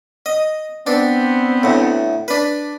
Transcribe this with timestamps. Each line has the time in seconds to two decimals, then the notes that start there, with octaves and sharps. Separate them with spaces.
0.26 D#5
0.87 B3 C4 D4
1.63 D2 A2
2.28 D4 B4